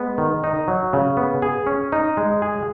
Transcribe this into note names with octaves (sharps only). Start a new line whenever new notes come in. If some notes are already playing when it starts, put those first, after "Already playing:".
Already playing: G#3 B3
D#3
D#4
F#3
C#3
B3
G#4
C#4
D#4
G#3
G#4